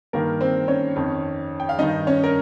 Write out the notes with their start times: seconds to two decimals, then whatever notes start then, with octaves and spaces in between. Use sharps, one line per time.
0.13 G2 D#3 A#3 A#4
0.41 C4 C5
0.68 C#4 C#5
0.96 F2 D#3
1.60 G5
1.69 F5
1.79 G2 D#3 D#4 D#5
2.07 C#4 C#5
2.24 A#4